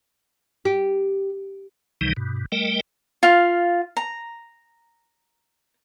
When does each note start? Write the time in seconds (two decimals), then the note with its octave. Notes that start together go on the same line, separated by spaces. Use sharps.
0.65 G4
2.01 C#2 C3 D#3 E3 G3 D#4
2.17 G2 B2
2.52 G3 A3 A#4 D#5 G5
3.23 F4 F5
3.97 A#5